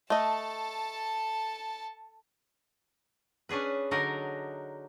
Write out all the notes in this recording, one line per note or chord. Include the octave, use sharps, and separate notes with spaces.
A3 A4 D#5 A5
C#4 D4 G#4 B4
D3 F#3 D4 D#4 A#4 D#5